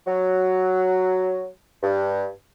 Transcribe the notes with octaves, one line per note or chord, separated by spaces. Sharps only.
F#3
G2